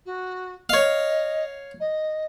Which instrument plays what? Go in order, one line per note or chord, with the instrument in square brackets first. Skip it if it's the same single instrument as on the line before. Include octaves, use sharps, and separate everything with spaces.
[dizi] F#4
[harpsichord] C#5 F5 [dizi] D#5
[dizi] D#5